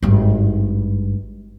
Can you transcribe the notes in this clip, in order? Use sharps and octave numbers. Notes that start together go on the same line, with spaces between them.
G#1 G2